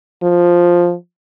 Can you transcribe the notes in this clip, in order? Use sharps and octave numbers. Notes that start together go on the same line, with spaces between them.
F3